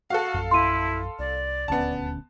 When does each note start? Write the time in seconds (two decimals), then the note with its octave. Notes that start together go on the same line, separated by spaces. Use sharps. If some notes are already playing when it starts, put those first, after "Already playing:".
0.10 F#4 A4 F5
0.34 A#1 F#2
0.51 E4 C6 D#7
1.19 C2 D5
1.68 D#1 D2 B3 C#4 A5